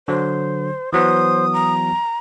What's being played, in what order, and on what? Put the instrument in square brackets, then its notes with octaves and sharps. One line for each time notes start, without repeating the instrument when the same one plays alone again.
[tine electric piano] D3 F#3 [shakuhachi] C5
[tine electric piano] E3 F#3 B3 [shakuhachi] C5 [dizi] D#6
[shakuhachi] A#5